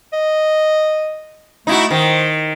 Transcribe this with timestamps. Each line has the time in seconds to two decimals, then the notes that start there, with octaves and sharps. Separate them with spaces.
0.13 D#5
1.67 A3 D#4 E4 F#4
1.90 D#3 C5